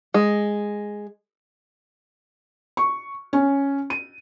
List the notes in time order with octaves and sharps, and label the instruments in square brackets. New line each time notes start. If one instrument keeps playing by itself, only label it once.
[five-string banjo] G#3
[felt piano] C#6
C#4
D#7